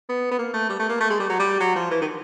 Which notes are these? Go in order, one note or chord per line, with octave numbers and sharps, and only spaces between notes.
B3
B3
A#3
A3
G3
A3
A#3
A3
G#3
G3
F#3
G3
F#3
F3
E3
D#3